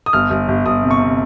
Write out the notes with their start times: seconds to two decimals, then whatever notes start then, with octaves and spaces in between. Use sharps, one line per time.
0.06 D#6
0.13 G1 F6
0.31 G1
0.48 G1
0.66 G1 D#6
0.83 C3
0.91 C#6
0.99 C3